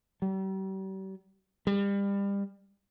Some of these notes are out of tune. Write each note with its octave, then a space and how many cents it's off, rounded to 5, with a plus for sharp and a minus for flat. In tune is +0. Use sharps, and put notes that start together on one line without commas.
G3 -40
G3 +30